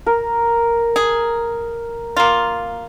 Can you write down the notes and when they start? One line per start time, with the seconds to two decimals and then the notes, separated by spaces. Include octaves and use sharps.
0.06 A#4
0.96 G#4
2.17 A#3 F4